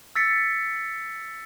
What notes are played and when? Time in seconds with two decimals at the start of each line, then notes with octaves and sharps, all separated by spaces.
0.15 E6 A6 B6 C#7